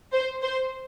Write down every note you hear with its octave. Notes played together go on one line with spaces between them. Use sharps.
C5
C5